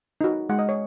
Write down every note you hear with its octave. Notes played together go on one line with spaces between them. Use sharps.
D#4 F#4
G#3 F#5
D#5
C#5